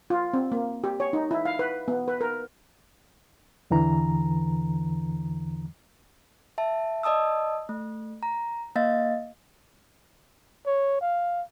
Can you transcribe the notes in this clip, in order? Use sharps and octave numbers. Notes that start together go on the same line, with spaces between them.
F4
C4
A#3
G4
C#5
D#4
E4
F5
B4
B3
B4
A#4
E2 D3 E3 A#5
E5 A5
D5 D#5 A5 D#6 E6
A3
A#5
A#3 D#5 F5 A6
C#5
F5